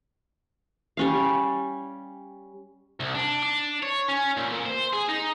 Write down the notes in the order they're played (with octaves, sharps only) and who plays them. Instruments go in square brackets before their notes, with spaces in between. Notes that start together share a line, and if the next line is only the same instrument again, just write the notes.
[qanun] G3 C#4 F5
[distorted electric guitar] C2
D4
D4
C#5
C#4
A#2
A#2
C5
G#4
D#4